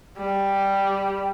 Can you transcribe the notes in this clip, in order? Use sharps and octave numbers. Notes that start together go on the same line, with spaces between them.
G3